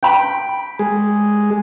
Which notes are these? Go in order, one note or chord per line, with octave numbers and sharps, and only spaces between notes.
G5 B5
G#3 G#4